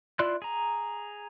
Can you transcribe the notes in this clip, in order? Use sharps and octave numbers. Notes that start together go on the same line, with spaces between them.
E4 F4 D5 C6 F#6
G#4 A#5